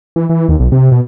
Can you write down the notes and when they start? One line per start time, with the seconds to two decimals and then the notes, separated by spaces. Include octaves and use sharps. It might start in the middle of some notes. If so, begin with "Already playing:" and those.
0.16 E3
0.30 E3
0.49 D#2
0.60 B1
0.72 C3
0.92 B2